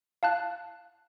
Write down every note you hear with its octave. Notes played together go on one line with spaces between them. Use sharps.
F5 A5 F#6